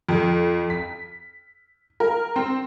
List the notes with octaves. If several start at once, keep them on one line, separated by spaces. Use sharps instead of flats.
F2
B6
A#4
C4